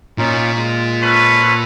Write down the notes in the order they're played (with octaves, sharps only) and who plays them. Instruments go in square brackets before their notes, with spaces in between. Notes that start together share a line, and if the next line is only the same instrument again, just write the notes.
[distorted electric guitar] A#2 [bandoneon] C#4 D#4 F4
[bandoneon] G#3 F4
[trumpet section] C#4 A4 B4